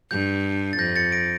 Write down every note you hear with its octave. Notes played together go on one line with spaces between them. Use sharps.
G2 G6
A6
F2 G6 A#6
A6 C#7
A#6 D7